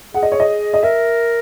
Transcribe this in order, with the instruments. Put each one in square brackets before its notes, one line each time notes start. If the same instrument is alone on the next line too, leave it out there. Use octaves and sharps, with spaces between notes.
[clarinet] G#4 [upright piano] F#5
[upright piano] D#5
C#5
D#5
D#5
[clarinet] A#4 [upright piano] E5